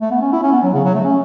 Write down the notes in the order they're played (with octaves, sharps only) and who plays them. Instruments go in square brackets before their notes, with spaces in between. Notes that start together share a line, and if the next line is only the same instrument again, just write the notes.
[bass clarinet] A3
B3
C#4
E4
C#4
B3
F#3
C#3
F#3
A3
C#4